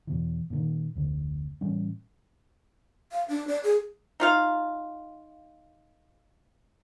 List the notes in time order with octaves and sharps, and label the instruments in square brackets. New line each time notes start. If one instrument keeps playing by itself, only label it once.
[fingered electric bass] E2 B2 E3
A#2 D3 D#3
F1 D2
A2 E3 G3 C#4
[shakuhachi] F5
D4
D5
G#4
[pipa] D#4 F4 F5